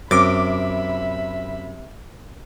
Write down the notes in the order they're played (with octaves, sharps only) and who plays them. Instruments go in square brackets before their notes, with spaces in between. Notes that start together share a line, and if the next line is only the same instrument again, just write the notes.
[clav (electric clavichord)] F#2 [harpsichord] C3 [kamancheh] E5 B5 [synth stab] D6